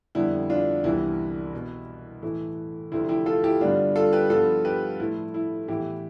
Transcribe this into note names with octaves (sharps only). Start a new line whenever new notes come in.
F2 D3 G3 B3 E4
D4 F4
C2 C3 E3 B3 E4
B2 B3
A2 E3 A3 E4
D2 C3 F3 A3 E4
E4 G4
F4 A4
E4 G4
G2 D3 G3 B3 D4 F4
F4 A4
G4 B4
G2 F3 B3 F4 A4
G4 B4
A2 F3 A3 E4
E4
A2 E3 B3 E4 G4